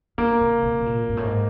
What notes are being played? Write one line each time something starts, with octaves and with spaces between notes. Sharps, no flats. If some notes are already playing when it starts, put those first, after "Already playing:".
D#3 A#3
C3
B2
B2
A#2
G#2
A2
G#2